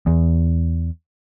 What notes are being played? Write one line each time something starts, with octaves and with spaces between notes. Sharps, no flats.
E2